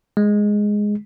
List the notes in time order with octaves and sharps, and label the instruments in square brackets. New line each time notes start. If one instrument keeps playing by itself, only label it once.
[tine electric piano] G#3